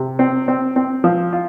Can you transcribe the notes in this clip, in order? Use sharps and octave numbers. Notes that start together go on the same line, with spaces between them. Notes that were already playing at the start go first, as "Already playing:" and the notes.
Already playing: C3
C4
C4
C4
F3
F4